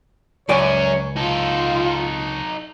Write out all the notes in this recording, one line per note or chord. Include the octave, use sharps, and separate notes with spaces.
C#2 F#2 C#4 C#5 D5 G#5
D#4 F4 A4